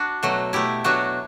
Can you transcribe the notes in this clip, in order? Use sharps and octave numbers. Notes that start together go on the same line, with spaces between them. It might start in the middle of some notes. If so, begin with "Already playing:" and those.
Already playing: D4 F#4
B2 F#3 A3
B2 A3 E4 G4
B2 F#3 A3 D4 F#4